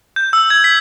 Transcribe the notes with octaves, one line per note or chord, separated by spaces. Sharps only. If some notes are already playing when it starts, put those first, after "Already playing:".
G6
E6
G#6
B6